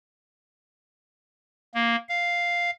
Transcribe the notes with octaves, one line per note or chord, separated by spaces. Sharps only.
A#3
F5